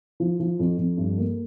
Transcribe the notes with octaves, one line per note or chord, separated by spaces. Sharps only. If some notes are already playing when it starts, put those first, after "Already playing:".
F3
F3
F2
F2
G2
A#3